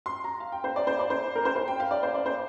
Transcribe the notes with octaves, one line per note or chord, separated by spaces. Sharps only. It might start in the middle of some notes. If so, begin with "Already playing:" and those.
C6
A#5
F5
G5
C5
D5
C5
D5
C5
A#4
C5
C5
G5
F5
D5
C5
D5
C5